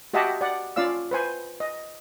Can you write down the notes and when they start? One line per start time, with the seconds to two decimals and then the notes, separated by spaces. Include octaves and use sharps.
0.13 F#4 G4 D#5 E5 F#5 A5
0.41 D5 F#5
0.76 C#4 F4 D5 F5 E6
1.11 B4 C5 G#5
1.60 D#5